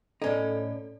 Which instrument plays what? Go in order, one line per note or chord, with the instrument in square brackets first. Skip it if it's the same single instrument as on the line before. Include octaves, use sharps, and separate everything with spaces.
[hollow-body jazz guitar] A2 C#4 D#4 [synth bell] A4 D5